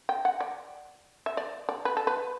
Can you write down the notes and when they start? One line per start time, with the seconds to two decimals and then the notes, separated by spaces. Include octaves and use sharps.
0.09 G5
0.25 F#5
0.40 D5
1.26 E5
1.37 D5
1.69 D5
1.85 B4
1.97 A4
2.07 B4